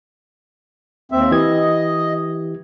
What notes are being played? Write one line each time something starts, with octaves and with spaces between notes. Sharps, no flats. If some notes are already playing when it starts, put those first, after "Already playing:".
D#2 C4 E5
E3 G4 D#5 G#6